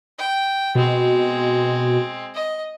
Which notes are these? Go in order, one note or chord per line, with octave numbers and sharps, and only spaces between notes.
G5
B2 G#3 C4
D#5